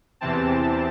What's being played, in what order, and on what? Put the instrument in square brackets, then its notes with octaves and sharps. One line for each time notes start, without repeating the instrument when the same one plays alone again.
[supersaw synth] E2 C3 E3 C4 A5